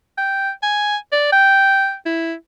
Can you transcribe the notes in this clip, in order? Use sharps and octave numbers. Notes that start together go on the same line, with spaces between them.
G5
G#5
D5
G5
E4